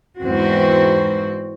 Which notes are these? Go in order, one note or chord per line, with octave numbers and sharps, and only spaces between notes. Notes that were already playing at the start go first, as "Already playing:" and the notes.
E2 G#2 C4 F#4